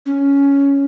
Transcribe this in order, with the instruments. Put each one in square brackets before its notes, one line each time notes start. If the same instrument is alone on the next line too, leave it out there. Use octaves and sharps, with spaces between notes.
[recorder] C#4